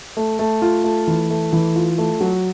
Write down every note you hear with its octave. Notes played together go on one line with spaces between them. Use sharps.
A3
A3
F4
A3
E3
A3
E3
F4
A3
F#3